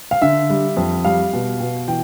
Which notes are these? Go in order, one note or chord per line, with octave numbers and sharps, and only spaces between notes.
F5
D3 E5
G3
F2
G3 F5
B2
B2
E3 G5